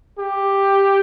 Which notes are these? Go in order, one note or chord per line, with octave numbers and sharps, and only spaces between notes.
G4